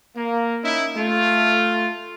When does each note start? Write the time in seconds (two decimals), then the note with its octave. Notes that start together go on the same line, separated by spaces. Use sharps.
0.16 A#3
0.64 C#4 D#4 E4
0.96 A3 F4